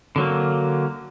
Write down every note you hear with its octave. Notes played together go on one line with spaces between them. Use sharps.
D3 F#3 A#3